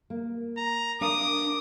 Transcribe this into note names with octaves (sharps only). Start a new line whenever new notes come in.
A#3
A#5
D4 A#4 F5 D6 D#6